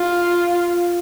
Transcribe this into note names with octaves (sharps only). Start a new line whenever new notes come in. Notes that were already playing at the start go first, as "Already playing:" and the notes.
Already playing: F4